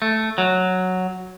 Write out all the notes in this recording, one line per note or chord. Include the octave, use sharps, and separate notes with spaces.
A3
F#3